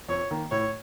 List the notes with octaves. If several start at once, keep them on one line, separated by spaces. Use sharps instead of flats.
F2 C#5
D#3 A#3
A2 C#5